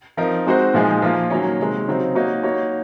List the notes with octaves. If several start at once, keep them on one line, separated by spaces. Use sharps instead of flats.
F3 C4 D#4 A#4
G#3 C4 D#4 F#4 C5
A#2 F3 G#3 D#4 G#4
F3 A#3 F4
D#3 F#3 A#3 C#4
C3 D#3 G#3
C#3 F#3 C4 D#4
A#3 D#4 F#4 C#5
A#3 D#4 F#4 C#5